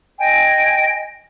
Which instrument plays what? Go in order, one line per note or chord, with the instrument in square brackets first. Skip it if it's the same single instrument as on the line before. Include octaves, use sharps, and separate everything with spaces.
[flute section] D#5 G5 G#5